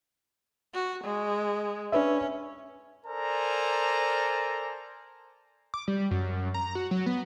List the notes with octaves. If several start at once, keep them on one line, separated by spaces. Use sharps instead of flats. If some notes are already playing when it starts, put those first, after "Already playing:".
F#4
G#3
C#4 D4 B4 E5
A4 A#4 C5 D5 G#5 A#5
D6
G3
F#2
A#5
F#4
F#3
B3